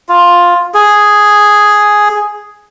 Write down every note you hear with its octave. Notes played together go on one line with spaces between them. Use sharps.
F4
G#4